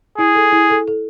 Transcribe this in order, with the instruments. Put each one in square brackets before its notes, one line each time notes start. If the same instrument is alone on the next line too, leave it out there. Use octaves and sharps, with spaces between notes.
[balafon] E4 [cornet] G#4
[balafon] A4
E4
A4
A4